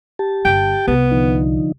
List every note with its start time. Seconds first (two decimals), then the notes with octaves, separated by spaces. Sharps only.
0.19 G4 A5
0.45 G1 D3 G5
0.87 C2 B3
1.11 D3 F3 D#4